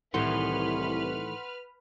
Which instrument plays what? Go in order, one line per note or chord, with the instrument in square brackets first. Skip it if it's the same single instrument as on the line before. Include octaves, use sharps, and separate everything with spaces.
[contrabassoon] C2 [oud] A2 D#3 E3 [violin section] B4 F6 [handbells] F#5 C6